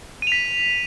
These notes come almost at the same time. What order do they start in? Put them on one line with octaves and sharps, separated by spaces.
D#7 F7 B6